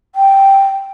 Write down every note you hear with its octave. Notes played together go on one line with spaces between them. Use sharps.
G5